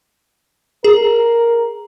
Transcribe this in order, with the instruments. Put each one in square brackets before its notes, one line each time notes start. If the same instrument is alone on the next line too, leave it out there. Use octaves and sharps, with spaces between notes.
[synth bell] G#4 [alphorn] A#4